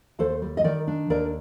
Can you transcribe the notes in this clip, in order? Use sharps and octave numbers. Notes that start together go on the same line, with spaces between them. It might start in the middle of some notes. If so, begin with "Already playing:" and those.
D#2 A4 C5
G3
D#5
D#3 A#4 D5
D4
D#2 A#4 D5